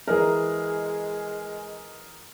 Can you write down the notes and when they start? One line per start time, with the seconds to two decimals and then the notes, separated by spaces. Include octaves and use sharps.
0.07 E3 G#3 G#4 A#4